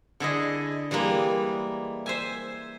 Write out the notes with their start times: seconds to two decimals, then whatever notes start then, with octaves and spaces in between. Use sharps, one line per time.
0.20 D3 E4 G#4 D#5
0.91 E3 G3 G#3 A#3
2.06 C5 E5 G#5